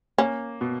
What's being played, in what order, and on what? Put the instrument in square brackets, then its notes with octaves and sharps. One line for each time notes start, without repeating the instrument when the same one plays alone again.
[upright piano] A#3 [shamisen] C#4
[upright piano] B2